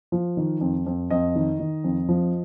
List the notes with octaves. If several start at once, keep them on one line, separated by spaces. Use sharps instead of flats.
F3
D#3
F2
F2
F2 D#5
D#3
D#3
F2
F3